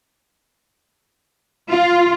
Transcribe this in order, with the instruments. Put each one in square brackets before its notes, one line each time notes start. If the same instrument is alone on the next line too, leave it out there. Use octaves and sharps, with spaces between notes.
[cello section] F4